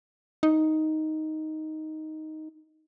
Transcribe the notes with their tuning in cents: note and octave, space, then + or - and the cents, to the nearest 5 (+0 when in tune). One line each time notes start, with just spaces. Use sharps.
D#4 +5